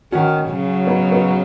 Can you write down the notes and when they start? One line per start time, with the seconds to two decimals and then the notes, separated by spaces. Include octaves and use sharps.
0.12 D#3 C#4 F#4
0.49 C#3 F#3
0.87 B3 D#4
1.12 B3 D#4